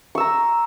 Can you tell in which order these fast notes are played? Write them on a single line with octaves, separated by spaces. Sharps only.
C#6 E6 A#5